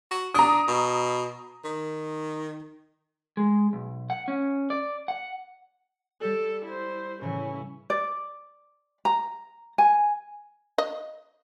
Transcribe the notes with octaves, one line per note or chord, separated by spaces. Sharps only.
F#4
D4 A#5 D#6
B2
D#3
G#3
B1
F#5
C#4
D5
F#5
G3 G4 A4 D5
E4 C5
A2 C#3 E3 C#4 E4
D5
A#5
G#5
D#5